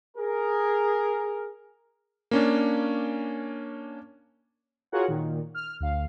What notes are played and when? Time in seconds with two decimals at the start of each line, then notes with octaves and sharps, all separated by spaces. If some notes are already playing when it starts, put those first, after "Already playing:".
0.17 G#4 A#4
2.31 A#3 C#4 D4
4.92 F4 F#4 G#4 A#4 C#5 F#5
5.08 A#2 D#3
5.55 F6
5.80 D2 F5